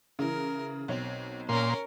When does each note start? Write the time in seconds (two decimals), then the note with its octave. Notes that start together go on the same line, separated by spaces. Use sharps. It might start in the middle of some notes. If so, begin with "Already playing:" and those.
0.19 C#3 E3 A#4
0.88 B1 C4 C#5
1.49 A#2 C#4 A#4 C6